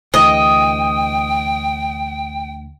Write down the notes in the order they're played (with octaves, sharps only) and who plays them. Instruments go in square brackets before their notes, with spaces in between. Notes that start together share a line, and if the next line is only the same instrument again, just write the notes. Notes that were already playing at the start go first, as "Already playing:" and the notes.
[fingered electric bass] D2 E3 [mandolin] D#5 [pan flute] G5